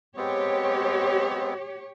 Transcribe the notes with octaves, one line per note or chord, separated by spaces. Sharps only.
G#3 B3 C4 G4 C#5